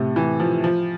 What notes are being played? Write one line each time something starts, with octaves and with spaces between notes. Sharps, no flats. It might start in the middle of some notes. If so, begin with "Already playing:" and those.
Already playing: A2 C3
E3
F3
F3